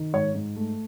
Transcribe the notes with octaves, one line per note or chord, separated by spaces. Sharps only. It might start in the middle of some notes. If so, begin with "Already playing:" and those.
Already playing: D#3
G#2 C#5
G#2
A3